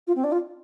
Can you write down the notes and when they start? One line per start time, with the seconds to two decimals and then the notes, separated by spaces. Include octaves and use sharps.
0.07 F4
0.15 C4
0.24 D4
0.32 F4